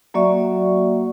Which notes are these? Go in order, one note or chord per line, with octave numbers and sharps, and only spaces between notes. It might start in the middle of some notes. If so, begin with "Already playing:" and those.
F#3 A#3 F#4 D5 E5 C#6